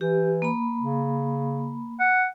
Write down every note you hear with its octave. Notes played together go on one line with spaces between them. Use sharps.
E3 G4
A#3 B5
C#3
F#5